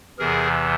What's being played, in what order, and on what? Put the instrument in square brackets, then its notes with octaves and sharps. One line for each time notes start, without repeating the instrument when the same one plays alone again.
[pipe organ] E2 C3 E3 G#4 A#4